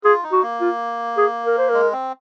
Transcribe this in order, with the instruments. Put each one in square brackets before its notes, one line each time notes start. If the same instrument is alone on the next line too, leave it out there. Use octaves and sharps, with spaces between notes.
[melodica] F4 [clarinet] G#4
[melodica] D#4
[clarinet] F#4
[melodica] A#3
[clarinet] F4
G#4
A#4
C5
[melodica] G#3 [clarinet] A#4
[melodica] C4